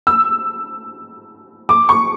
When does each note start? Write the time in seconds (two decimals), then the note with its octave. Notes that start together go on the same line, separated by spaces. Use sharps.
0.07 E6
1.69 D6
1.89 C#6